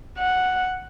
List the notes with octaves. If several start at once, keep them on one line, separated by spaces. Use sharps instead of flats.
F#5